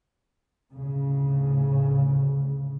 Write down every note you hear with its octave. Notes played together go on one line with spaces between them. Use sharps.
D2 A2 C#3